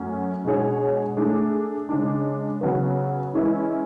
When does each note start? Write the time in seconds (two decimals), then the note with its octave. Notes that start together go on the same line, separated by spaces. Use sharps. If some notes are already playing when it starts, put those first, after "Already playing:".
Already playing: F#2 A3 C#4 F#4
0.44 B2 G#3 D4 G#4 C#5
1.17 A3 D4 G#4
1.89 C#3 G#3 D4
2.61 C#3 F#3 B3 F#4 B4
3.33 E3 G#3 C#4 E4 B4